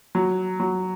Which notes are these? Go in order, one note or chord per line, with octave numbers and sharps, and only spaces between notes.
F#3
F#3